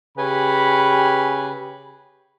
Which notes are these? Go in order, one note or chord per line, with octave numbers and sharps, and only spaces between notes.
C#3 G4 B4 G#5 B5